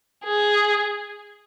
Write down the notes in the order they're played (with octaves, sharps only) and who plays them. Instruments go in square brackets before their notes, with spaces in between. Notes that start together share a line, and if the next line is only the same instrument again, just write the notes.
[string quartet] G#4